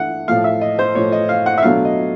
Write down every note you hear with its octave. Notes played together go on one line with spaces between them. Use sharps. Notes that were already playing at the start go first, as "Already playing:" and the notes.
Already playing: E3 A3 D4 F#5
A2 F3 A3 F5
E5
D#5
C5
A2 F3 A3 C#5
D#5
F5
F#5
E5
B2 F#3 A3 D4 F5
D#5